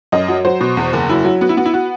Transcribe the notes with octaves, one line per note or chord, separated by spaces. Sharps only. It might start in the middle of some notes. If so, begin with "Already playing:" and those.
F#2 D#5
F#3
F#3 C5
B2
E2
F#1
F#3 E4
F#3
B3 F#4
E4
B3 F#4
E4
F#4